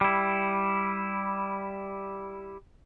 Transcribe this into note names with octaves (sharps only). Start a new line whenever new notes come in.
G3 E4